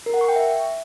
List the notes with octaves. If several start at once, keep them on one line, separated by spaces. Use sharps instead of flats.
A#4
F#5
C#6
G5
E5